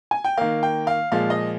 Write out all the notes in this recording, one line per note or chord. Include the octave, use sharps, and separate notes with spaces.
G#5
G5
D#3 A#3 F5
G5
F5
A#2 F3 G#3 F5
D#5